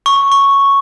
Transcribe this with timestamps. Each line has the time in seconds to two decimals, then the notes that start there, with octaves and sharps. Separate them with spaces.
0.06 C#6
0.32 C#6